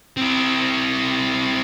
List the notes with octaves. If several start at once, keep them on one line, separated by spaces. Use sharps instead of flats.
C4 E4